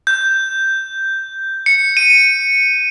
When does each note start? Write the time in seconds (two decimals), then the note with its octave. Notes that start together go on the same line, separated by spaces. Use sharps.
0.07 G6
1.66 C#7
1.97 D#7